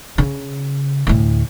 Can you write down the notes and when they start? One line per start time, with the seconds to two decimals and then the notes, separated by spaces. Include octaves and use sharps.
0.18 C#3
1.07 D2 A2